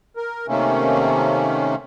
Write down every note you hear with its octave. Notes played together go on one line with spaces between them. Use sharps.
A#4
C3 D#3 A3 A#3 C#4